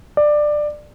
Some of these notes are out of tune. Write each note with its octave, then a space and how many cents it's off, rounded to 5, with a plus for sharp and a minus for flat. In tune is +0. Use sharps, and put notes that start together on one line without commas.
D5 +15